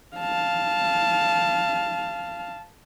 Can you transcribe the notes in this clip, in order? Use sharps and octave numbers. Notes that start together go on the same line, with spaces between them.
F5 A5